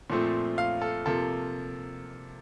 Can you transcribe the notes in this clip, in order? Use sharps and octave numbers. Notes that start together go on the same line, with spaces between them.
A#2 F3 A3 C4
F5
A4
C3 F3 A#3 A4